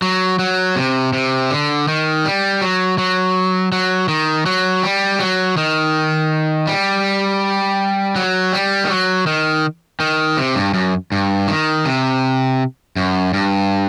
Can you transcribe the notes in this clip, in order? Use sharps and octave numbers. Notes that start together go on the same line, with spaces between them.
F#3
F#3
C3
C3
D3
D#3
G3
F#3
F#3
F#3
D#3
F#3
G3
F#3
D#3
G3
F#3
G3
D#3
F#3
D#3
D#3
C3
G2
F#2
G2
D#3
C3
F#2
G2